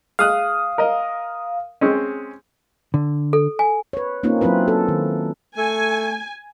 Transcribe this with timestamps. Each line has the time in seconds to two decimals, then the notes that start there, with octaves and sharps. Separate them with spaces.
0.19 G#3 F5 D#6 F#6
0.78 A#4 D#5
1.81 G#3 C4 C#4
2.94 D3
3.33 A4
3.59 G#5
3.93 B4 C#5
4.23 A#3 C4 C#4 D#4 F4
4.41 F#3 C4 E4 F4 B4
4.68 A4
4.88 D#3
5.57 A3 G#5